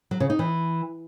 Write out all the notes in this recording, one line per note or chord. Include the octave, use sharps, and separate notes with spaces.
F#3
C#3
D#4
E3